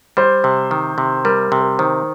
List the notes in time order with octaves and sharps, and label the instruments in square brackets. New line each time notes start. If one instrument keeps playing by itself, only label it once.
[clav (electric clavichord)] G3 [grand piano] C5
[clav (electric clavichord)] C3
D#3
C3
[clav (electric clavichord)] G3 [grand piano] A#4
[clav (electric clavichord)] C3
[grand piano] A#4
[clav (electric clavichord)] D#3 [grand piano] C5